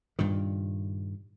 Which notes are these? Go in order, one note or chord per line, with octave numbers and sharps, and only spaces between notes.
G2 A#2 D#3